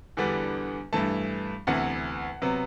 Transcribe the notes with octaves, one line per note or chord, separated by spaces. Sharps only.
E2 D3 G3 B3 D4
G2 E3 A3 A5
D2 C3 E3 B3 F#5
C3 F#3 B3